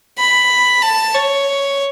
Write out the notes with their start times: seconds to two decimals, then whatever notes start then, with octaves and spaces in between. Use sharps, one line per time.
0.18 B5
0.82 A5
1.14 C#5